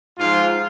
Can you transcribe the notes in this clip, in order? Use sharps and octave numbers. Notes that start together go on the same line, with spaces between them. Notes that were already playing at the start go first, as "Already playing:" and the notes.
G#2 F3 F4